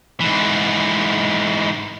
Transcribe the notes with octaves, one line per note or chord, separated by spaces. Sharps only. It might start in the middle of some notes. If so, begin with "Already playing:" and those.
G#2 E3